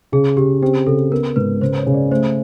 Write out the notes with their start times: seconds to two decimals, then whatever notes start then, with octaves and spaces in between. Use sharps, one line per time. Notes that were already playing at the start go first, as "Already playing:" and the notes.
0.12 C#3 G#4
0.37 C#3 G4
0.62 C4 G4
0.87 C#3 A4
1.12 B3 A#4
1.36 G#2 B4
1.61 C#3 C5
1.78 C#5
1.86 C#3
1.94 D5
2.11 A3 C5